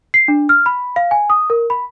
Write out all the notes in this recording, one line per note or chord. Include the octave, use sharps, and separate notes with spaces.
C7
D4
F6
B5
F5
G#5
D#6
A#4
B5